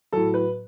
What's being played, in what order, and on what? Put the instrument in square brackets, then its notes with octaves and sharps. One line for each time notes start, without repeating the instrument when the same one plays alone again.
[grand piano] A2 F#3 A4
B4